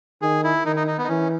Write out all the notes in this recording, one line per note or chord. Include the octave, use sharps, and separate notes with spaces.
D#3 G#4
E4
D#3 D#4
D#4
D#4
B3
D#4
E3 C#4